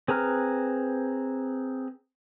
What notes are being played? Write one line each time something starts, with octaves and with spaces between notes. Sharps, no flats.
C4 G#4 B4 A#5 F6